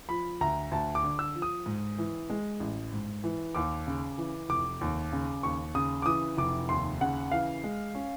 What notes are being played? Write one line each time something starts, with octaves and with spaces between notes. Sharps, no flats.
F3 B5
D2 A#5
D2 A5
D6
D3
E6
F3
D#6
G#2
E3
G#3
A1
G#2
E3
D#2 D6
C#3
E3
F1 D6
D#2
C#3
D#2 C#6
C#3 D#6
D6
E3 D#6
F1 D6
D#2 C6
C#3 F#5
E3 F5
G#3
C#4